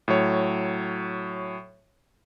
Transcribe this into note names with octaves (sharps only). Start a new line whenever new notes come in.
A2 F#3 C#5